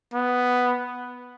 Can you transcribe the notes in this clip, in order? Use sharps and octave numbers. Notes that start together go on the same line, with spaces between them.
B3